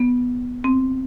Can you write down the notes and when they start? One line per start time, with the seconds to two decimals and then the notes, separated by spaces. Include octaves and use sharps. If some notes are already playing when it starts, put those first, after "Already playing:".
Already playing: B3
0.64 C4